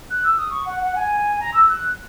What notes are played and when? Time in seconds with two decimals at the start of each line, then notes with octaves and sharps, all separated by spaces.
0.09 F#6
0.23 E6
0.37 D#6
0.50 C#6
0.65 F#5
0.79 F#5
0.94 G#5
1.39 A#5
1.53 E6
1.68 F#6